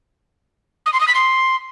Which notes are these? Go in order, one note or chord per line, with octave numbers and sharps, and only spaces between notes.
D#6
C6
D#6
B6
C6